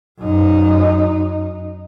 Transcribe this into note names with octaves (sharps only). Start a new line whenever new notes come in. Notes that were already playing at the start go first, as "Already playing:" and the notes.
F#2 D#4